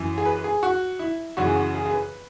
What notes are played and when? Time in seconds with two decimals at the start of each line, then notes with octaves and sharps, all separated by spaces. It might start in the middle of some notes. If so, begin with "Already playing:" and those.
Already playing: F#2 E3
0.18 G#4
0.25 B4
0.44 G#4
0.63 F#4
0.99 E4
1.37 F#2 C#3 E3 F#4
1.46 G#4
1.55 F#4
1.74 G#4
1.86 G#4
1.93 B4